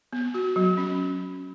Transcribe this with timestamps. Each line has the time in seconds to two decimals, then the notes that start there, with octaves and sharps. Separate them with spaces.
0.13 B3
0.34 F#4
0.56 F#3
0.77 C#4